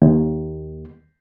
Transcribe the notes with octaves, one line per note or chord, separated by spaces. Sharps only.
D#2